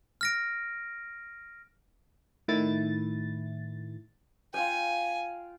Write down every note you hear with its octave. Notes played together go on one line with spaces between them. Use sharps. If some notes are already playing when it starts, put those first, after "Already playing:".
F6 A#6 D7
A2 D#3 E4 A6
F4 F5 G5 G#5